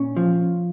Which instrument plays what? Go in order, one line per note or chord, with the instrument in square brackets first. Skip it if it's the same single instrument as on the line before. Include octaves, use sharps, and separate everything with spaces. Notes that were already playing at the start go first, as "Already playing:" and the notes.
Already playing: [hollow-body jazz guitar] A#2 C#4
F3